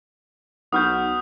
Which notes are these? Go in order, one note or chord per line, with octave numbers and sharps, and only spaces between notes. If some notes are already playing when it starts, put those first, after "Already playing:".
B1 F#4 B4 D#6 F6 G6